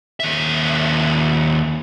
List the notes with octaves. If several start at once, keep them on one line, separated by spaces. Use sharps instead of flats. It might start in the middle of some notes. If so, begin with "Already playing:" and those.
D#2 E5